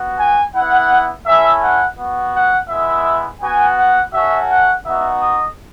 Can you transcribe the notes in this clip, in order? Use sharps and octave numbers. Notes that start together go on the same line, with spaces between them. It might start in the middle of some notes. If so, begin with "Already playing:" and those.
Already playing: B3 F#4
G#5
B3 E4 F#5
A3 C#4 E4 E5
F#5
B3 F#4
F#5
G#3 B3 E4 E5
B3 F#4 G#5
F#5
A3 C#4 F#4 E5
F#5
B3 D#4 F#4 E5
D#5